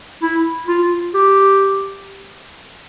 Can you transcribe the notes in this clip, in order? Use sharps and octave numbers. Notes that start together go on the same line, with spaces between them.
E4
F4
G4